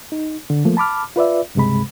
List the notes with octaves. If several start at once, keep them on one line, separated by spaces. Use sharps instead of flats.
D#4
D3
F3 A3 A#3
A5 B5 D6 F6
F4 B4 D5 E5
C#2 G2 C3 G#3 B5